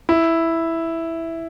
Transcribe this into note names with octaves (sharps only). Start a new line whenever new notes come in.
E4